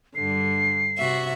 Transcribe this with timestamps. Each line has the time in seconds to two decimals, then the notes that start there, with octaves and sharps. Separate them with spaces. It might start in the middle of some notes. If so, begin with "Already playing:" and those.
0.15 G2 D3 C7
0.98 C3 F#4 E5